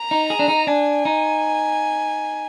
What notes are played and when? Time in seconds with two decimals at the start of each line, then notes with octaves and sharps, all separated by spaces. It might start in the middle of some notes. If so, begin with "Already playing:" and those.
Already playing: A#5
0.11 D#4
0.30 G#4
0.39 D4
0.48 D#4
0.67 D4 G#5
1.05 D#4